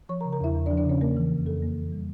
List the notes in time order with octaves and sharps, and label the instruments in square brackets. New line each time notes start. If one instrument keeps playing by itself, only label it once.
[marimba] F3 C#5 C#6
A#4 A#5
C#3
A#4 A#5
E2 E4 E5
E2
D4 D5
F3
D4 D5
C#3 C#4 C#5
A#3 A#4
E3
F2
F2 A4
A#3
E3
G3